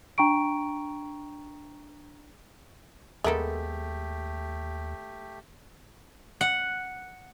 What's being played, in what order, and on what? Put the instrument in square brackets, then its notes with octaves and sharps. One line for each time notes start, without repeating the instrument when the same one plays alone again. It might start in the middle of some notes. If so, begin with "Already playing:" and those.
[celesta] D4 G5 A#5 C#6 D7
[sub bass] D#2 [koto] G#3 B3 A4 [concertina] A3 G4 [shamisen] A#4 E5
[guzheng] F#5